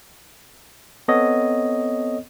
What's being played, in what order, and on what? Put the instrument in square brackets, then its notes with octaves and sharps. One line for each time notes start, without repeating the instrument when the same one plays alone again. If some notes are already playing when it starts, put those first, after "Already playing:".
[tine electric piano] B3 C4 A4 C#5 D#5